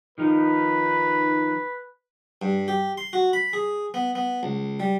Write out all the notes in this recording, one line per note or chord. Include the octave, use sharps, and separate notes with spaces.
D#3 F3 D#4 B4
G2
G4
C6
F#4
B5
G#4
B3
B3
C#2
G3